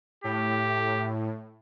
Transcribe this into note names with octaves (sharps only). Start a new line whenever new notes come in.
A2 G4